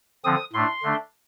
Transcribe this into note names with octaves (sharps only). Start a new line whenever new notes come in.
D3 F3 C4 D#6
A2 A3 D4 C6
D3 A3 D4